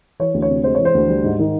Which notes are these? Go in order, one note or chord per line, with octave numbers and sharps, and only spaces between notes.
E3 C#5
D2
C#5
C3
G#3 C5
E3 C#5
C5
D2
G3
G#2
D#3